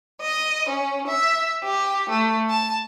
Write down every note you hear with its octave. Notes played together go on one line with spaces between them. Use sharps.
D#5
C#4
E5
G4
A3
A5